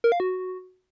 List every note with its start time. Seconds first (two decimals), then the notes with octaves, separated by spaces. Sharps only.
0.04 A#4
0.12 F5
0.20 F#4